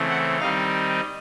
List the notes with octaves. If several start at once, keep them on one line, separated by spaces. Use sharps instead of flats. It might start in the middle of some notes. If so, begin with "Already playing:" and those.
Already playing: C#3 E3 A3 C4
F#5
D#3 G3 C4 D#4 F5